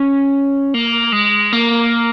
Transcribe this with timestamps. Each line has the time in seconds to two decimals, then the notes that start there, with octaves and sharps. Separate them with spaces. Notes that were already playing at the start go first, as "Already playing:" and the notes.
Already playing: C#4
0.74 A#3
1.13 G#3
1.53 A#3